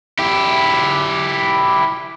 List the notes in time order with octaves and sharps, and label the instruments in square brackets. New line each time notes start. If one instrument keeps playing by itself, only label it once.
[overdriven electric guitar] E4 G4